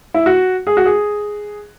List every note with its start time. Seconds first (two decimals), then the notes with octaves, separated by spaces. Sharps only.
0.14 E4
0.26 F#4
0.67 G#4
0.77 F#4
0.85 G#4